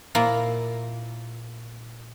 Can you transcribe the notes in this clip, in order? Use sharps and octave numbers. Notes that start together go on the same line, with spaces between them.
A#2 A#3 E4 F4 A#5